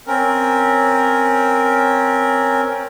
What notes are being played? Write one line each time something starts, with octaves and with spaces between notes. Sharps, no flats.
C4 C#4 A#4